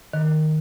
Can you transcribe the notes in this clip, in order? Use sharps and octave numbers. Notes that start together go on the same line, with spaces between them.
D#3